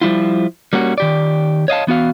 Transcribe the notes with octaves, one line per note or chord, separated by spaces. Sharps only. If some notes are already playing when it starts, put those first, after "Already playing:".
F3 G3 E4 F4
G3 A#3 C#4 F#4
D#3 G4 D5
C#5 D#5 F5 A5
E3 B3 F#4 F5